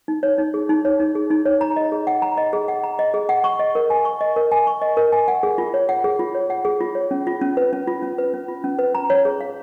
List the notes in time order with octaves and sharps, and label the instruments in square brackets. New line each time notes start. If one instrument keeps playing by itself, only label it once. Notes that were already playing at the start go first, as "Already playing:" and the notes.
[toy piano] D#4
C#5
D#4
G#4
D#4
C#5
D#4
G#4
D#4
C#5
A#5
D#5
G#4
F#5
A#5
D#5
G#4
F#5
A#5
D#5
G#4
F#5
C#6
D#5
A#4
G#5
C#6
D#5
A#4
G#5
C#6
D#5
A#4
G#5
F#5
G#4
F4
C#5
F#5
G#4
F4
C#5
F#5
G#4
F4
C#5
C#4
F4
C#4
B4
C#4
F4
C#4
B4
C#4
F4
C#4
B4
A#5
C#5
G#4
F5